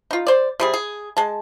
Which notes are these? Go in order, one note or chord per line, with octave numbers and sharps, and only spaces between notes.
D#4 F4
C5 D5
C3 G3 G#4
G#4
G#3 A5